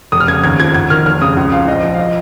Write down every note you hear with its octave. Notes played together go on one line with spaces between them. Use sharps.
F1 D#6
F6
C#3 G#6
D#2 G#6
F3 G#6
G#1 G#6
D#3 F6
F1 F6
C#3 D#6
C#2
F3 F5
A#1 D#5
F3
F5
D#5